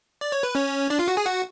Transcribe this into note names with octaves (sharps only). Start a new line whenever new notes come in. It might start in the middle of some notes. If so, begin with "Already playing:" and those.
D5
C#5
B4
C#4 C#5
D4 D5
F4 F5
F#4 F#5
G#4 G#5
F#4 F#5